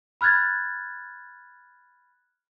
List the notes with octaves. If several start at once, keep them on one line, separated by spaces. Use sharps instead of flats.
B5 F6 F#6 G#6 A6